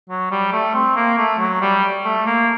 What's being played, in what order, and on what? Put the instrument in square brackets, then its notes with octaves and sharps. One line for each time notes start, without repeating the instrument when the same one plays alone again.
[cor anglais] F#3
G3
A3
C4
A#3
A3
F#3
G3
A3
A#3